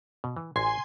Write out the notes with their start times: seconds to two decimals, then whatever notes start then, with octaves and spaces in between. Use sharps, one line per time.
0.24 B2
0.36 E3
0.56 A1 F#4 G#5 C6